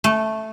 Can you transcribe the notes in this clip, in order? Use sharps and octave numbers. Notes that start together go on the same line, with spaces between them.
A3